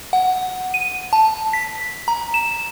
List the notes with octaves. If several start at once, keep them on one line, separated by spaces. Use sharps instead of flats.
F#5
D#7
A5
B6
A#5
E7